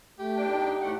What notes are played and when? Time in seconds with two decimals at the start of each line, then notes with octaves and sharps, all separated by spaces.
0.19 A3 G4
0.36 E2 D4 G5
0.50 D#4
0.82 A2 A3 F#5